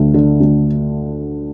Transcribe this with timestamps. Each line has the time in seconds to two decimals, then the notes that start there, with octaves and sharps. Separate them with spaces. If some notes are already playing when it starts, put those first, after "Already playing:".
Already playing: D2 D3
0.14 D3
0.41 D2